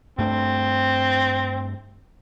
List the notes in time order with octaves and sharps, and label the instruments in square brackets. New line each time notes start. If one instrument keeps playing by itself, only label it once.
[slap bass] G2 A3 D4 [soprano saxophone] C4